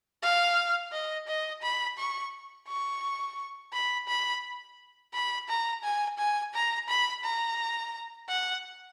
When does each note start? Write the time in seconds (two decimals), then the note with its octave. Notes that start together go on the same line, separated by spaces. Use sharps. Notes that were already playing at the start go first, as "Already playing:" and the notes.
0.22 F5
0.92 D#5
1.27 D#5
1.62 B5
1.98 C#6
2.68 C#6
3.73 B5
4.08 B5
5.13 B5
5.49 A#5
5.83 G#5
6.18 G#5
6.54 A#5
6.88 B5
7.24 A#5
8.29 F#5